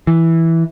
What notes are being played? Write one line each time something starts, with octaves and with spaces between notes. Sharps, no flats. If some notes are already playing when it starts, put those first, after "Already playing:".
E3